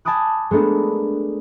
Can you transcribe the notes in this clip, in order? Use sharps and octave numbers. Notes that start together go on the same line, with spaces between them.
G#5 A5 B5 D6 D#6 F#6
G#3 A3 B3 D4 A#4